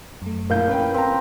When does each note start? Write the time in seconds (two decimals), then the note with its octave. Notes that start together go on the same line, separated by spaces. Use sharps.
0.22 F#2 A3
0.50 A#1 A2 A#4 F5 G6
0.67 C#4 B4 G5
0.94 C4 A#5 B5